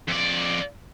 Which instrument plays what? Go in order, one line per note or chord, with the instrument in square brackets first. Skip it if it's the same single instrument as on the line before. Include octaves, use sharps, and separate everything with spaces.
[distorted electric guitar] F2 D5